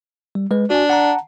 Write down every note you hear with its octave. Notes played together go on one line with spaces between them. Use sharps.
G3
G#3 B4
D4 F#4 G#5
F#5 A5 A#5